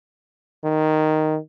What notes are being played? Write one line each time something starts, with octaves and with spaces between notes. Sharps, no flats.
D#3